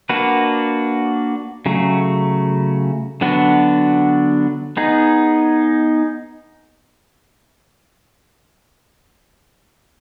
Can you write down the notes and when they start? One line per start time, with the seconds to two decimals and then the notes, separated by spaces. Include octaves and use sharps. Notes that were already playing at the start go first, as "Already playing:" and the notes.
0.09 A#3 D4 F#4 B4
1.66 C#3 F#3 A3
3.21 D3 F#3 B3 D4 F#4
4.77 B3 D#4 G#4